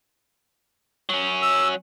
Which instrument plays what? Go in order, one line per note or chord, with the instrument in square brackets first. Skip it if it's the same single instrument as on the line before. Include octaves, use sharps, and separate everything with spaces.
[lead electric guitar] F#3 C#4
[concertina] E6